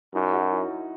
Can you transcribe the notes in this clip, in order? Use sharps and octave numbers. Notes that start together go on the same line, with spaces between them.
F#2 D#4
F#4
E4